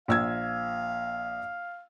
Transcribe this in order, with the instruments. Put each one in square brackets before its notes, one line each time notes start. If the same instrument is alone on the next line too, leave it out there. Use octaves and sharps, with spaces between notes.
[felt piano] A#1 E6 G#6 [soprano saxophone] F5